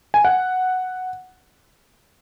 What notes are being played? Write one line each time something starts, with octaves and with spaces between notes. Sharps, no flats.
G#5
F#5